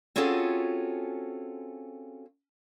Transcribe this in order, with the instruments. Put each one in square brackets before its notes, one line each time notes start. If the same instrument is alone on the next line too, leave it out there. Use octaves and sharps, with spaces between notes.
[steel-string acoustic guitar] C4 C#4 F4 F#4 G#4 A4